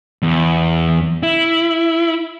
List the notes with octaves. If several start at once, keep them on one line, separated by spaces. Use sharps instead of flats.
E2
E4